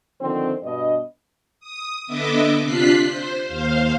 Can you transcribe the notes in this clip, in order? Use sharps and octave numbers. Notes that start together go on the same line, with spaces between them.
D3 D#3 F3 C4
G2 B2 D4 D#5
D#6
D3 B3 D#5 E5 D6
C3 D4 F4 F#6 B6 C7
C5
D#2 C5 F5